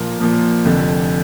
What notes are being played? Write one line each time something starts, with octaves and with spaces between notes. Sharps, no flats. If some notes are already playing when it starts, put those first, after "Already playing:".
Already playing: A#2 F3 A#3
A#2 F3 A#3
F1 F2 D3